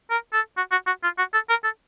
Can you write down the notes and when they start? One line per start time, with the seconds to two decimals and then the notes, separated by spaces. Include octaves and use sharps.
0.10 A#4
0.33 A4
0.57 F#4
0.72 F#4
0.87 F#4
1.03 F4
1.18 F#4
1.34 A4
1.50 A#4
1.64 A4